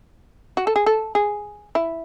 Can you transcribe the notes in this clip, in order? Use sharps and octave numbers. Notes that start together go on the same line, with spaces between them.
F#4
A4
G#4
A4
G#4
E4